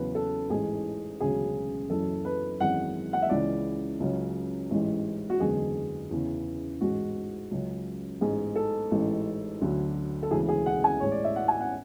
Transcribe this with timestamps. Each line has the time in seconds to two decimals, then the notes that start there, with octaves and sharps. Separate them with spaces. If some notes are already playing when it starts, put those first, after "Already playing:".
Already playing: E2 C#3 F#3 B4
0.15 A4
0.49 A1 G#2 E3 G#4
1.20 E1 D2 C#3 F#3 G#4
1.90 F#1 F#2 E3 A4
2.25 B4
2.60 G#1 F#2 E3 G#3 F#5
3.13 F#5
3.22 E5
3.30 C#2 C#3 E3 G#3 D5
4.00 C#2 C#3 F#3
4.70 A1 G#2 E3 G#3
5.30 F#4
5.40 F#1 E2 D3 G#3 G#4
6.11 E2 C#3 E3
6.80 A1 G#2 G#3 F#4
7.51 C#2 C#3 F#3
8.21 A1 G#2 G#3 G#4
8.56 A4
8.91 A1 G#2 E3 G#3
9.61 D2 D3 F#3
10.23 A4
10.31 E1 D2 C#3 E3 G#4
10.49 G#4
10.66 F#5
10.84 G#5
11.00 A1 A2 G#3 C#5
11.12 D5
11.24 E5
11.36 F#5
11.48 G#5
11.60 F#5